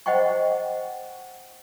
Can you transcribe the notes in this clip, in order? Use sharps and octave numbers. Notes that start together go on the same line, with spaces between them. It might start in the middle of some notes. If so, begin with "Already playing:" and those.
C5 D#5 F#5 G5 C#6